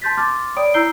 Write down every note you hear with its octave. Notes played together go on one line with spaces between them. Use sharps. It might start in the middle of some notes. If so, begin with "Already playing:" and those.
A5 C6 G6 A6 B6
C6 D6 F6 A6
C#5 D5 G5 B5 D#6 D7
E4 A#5 E6 G6 C7 G7